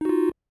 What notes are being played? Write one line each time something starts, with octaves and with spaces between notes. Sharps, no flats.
D#4 F4 F#4